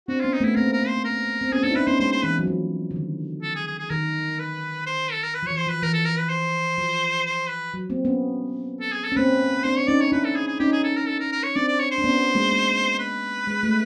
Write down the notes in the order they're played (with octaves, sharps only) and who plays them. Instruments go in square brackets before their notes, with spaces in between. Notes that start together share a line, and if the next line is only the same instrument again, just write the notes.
[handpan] C4 D4 [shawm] F#4
[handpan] B3 C#4 [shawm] F4
[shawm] D#4
[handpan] A3 B3 [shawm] E4
[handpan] A#3 C4 [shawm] A#4
[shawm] A#4
C5
A#4
[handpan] C4
[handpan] B3 C#4 [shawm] G#4
[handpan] C4 D4 [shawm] A4
[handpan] E4
[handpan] C#4 D#4 [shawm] B4
[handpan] B3 C#4 [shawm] C5
[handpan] G#3 A#3 [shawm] C5
[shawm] C5
[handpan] E3 [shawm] B4
[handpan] F#3
F3
D3
D#3
[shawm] A4
G#4
G#4
G#4
[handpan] D#3 [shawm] A#4
[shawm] B4
C5
A4
A#4
B4
[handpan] F3
[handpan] E3 [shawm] C#5
[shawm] C5
[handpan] F3 [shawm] B4
[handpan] E3 [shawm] A#4
[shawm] A4
A#4
B4
C5
[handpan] F3
[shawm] C5
B4
[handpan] F#3
A#3 C4
B3 C#4
[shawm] A4
G#4
A4
[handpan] C#4
[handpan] A#3 C4 [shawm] B4
[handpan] C4 D4 [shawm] C5
[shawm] C#5
[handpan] C#4 D#4 [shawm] D5
[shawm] C#5
[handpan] D4 E4 [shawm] B4
[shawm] A4
G#4
G#4
[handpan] C#4 D#4 [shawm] G4
[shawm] G#4
A4
A#4
A4
A#4
A#4
C#5
[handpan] C4 D4 [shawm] D5
[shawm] D5
C#5
C5
[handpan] D4
B3 C#4
G#3 A#3
G#3 A#3
[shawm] B4
[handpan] G#3
A3